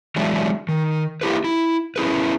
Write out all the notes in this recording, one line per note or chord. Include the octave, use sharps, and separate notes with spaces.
E3 F#3 G#3 D4
D#3
A#3 E4 G4 B4
E4
C#4 E4 G#4 B4